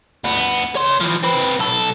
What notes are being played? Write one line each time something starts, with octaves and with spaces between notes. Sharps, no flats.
D2 B3
C#5 C6
E3 F3
C4 B4
B1 A4